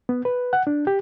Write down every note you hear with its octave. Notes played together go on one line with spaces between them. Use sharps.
B3
B4
F#5
D4
G4